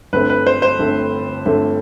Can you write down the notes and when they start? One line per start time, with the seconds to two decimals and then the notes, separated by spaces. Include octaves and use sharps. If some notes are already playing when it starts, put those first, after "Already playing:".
0.13 G1 G2 D3 A3 C4 B4
0.30 B4
0.47 C5
0.62 C5
0.79 G1 G2 D3 A3 C4
1.45 G1 G2 D3 A3 C4